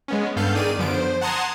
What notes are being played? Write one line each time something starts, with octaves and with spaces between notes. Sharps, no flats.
G#3 B3 C#4
G2 B3 A4 F5 G6
D#3 G#4 D5 D#7
F#2 D3 F3 B3 D7
C5
F#5 A5 A#5 C6 D#6 G#6